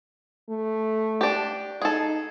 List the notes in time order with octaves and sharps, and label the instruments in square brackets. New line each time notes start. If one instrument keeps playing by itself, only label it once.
[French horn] A3
[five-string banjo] D4 G4
[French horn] D#4 [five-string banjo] G#4 A4